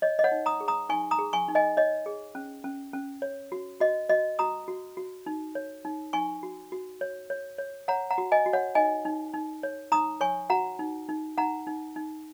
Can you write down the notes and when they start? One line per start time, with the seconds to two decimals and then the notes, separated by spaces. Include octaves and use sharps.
0.02 C#5 D#5
0.19 D#5
0.24 C#5 F#5
0.32 D#4
0.46 A#5 D#6
0.60 G#4
0.68 A#5 D#6
0.89 D#4 G#5 C#6
1.11 A#5 D#6
1.19 G#4
1.33 G#5 C#6
1.48 D#4
1.55 D#5 G#5
1.77 C#5 D#5
2.06 G#4
2.35 C#4
2.64 C#4
2.93 C#4
3.22 C#5
3.52 F#4
3.80 F#4 D#5
4.09 F#4 D#5
4.39 F#4 A#5 D#6
4.68 F#4
4.97 F#4
5.26 D#4
5.55 C#5
5.85 D#4
6.13 D#4 G#5 C#6
6.43 F#4
6.72 F#4
7.01 C#5
7.30 C#5
7.59 C#5
7.88 C#5 F#5 A#5
8.10 F#5 A#5
8.18 F#4
8.32 D#5 G#5
8.46 F#4
8.53 C#5 F#5
8.75 D#4 D#5 G#5
9.05 D#4
9.34 D#4
9.63 C#5
9.92 D#4 A#5 D#6
10.21 C#5 G#5 C#6
10.50 F#4 F#5 A#5
10.79 D#4
11.08 D#4
11.38 D#4 F#5 A#5
11.67 D#4
11.96 D#4